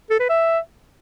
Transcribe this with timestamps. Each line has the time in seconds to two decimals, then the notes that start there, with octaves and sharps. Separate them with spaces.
0.10 A4
0.20 B4
0.29 E5